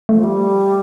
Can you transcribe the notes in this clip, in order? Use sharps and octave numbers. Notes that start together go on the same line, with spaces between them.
F3 A3
G3